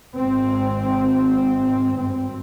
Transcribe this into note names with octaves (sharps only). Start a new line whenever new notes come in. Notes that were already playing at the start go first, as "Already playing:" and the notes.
G#1 G#2 C4
G#1 G2 C4